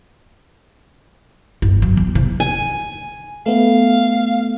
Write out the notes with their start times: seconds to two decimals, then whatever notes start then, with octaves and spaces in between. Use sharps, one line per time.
1.62 G#1 G2
1.82 F#3
1.97 E2
2.15 C3
2.40 G#5
3.46 A3 B3 F5